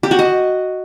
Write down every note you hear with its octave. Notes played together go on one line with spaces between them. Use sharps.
G4
F#4
D#5